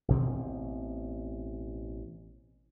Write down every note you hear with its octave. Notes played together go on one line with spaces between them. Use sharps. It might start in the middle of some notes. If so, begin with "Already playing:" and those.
A1 B2 C4